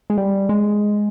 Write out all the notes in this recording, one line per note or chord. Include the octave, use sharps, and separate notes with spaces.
G#3
G3
G#3